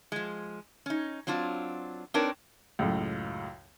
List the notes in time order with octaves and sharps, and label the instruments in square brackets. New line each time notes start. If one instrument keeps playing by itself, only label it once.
[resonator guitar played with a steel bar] F3 G#3
C#4 D#4
F#3 C4 D4 F4
C4 D4 D#4 A#4 B4 C#5
[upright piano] C#2 F#2 A2